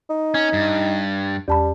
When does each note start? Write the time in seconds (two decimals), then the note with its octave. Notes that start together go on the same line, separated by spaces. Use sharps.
0.10 D#4
0.35 C#4
0.53 G2
1.48 E2 G3 A5 B5